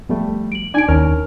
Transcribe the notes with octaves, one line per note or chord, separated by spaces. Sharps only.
F3 G3 A3 B3
D7 F#7
D4 D#4 D5 G#5 G#6 D7
D#2 C#4 A#4 F6